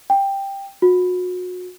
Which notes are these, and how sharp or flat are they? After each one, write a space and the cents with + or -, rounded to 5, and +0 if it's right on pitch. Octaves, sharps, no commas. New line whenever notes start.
G5 +10
F#4 -35